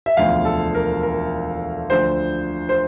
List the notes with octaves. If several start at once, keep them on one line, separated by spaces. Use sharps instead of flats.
E5
E1 D2 D3 F3 F5
A4
A#4
A#4
D2 D3 F3 C5
C5